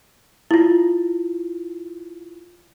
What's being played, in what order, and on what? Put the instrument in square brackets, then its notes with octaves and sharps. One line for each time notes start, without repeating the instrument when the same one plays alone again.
[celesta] E4 F4